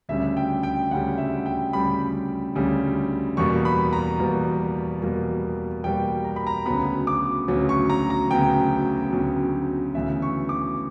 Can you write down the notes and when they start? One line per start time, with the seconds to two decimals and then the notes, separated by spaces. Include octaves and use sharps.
0.09 D2 C#3 G3 E5
0.37 G5
0.63 G5
0.91 D2 C#3 G3 F#5
1.18 E5
1.46 G5
1.73 D2 C#3 G3 B5
2.55 D2 C#3 G3
3.37 E2 B2 G3 A#3 C#6
3.65 B5
3.93 A#5
4.20 E2 B2 G3 A#3
5.02 E2 B2 G3 A#3
5.84 E2 B2 G3 A#3 G5
6.25 A#5
6.36 B5
6.47 A#5
6.66 D2 C#3 F#3 B3 B5
7.07 D6
7.48 D2 C#3 F#3 B3
7.69 C#6
7.90 A#5
8.10 A#5
8.31 D2 C#3 F#3 B3 G5
9.12 D2 C#3 F#3 B3
9.95 D2 C#3 E3 B3 E5
10.22 C#6
10.49 D6